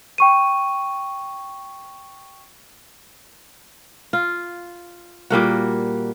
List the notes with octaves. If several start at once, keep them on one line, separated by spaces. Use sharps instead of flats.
G5 C#6 D#7
F4
A#2 G3 A#3 F#4